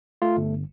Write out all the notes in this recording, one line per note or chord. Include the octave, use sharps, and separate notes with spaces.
A3 F4
G1